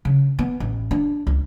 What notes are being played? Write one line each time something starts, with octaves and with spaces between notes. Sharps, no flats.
C#3
B3
A1
D4
C#2